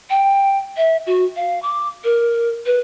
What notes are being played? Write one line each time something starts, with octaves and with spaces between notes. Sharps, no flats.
G5
E5
F#4
F5
D6
A#4
B4